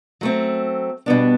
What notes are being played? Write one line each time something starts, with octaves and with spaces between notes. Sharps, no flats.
F#3 A3 C4
B2 G3 B3 D4